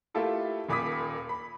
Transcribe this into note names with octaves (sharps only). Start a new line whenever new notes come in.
A3 E4 F4 G4 A4 A#4
D#1 A#2 B5 D6 D#6 B6
B5